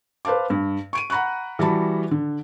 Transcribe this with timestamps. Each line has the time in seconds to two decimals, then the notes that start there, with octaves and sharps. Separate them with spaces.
0.25 B4 C5 F5 A5 D6
0.50 G2
0.93 C#6 D7 D#7
1.10 F#5 A#5 B5 C#6 F#6
1.59 E3 G3 F#4 A5 B5
2.11 D3